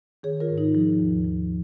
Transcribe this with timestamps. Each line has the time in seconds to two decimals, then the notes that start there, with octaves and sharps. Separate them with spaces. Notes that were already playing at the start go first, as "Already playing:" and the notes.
0.23 D#3 G#4 C#5
0.40 F4 A#4
0.49 G#2
0.58 D#4
0.75 F3
0.99 D#2
1.24 F3